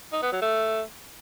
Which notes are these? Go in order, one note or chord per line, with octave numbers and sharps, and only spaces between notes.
D#4
B3
F#3
A3